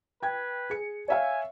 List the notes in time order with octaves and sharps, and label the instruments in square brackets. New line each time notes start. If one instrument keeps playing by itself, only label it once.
[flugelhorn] B4 [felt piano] G5 G#6
[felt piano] G#4 C#7
[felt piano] C#5 E5 F5 [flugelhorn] G#5